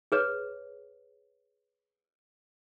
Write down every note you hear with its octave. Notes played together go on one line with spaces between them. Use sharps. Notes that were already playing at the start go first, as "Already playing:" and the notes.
G#4 B4 C#5